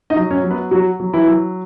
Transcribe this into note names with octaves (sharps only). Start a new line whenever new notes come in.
D#4 D#5
F#3
C#4 C#5
F#3
B3 B4
F#3 F#4
F#3
E3 E4
F#3